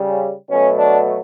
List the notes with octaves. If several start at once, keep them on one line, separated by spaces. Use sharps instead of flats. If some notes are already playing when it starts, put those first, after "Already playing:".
Already playing: C#3 G3
B2 F#3 A3 C#4
D4